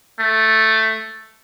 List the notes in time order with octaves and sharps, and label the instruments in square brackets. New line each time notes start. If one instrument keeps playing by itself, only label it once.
[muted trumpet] A3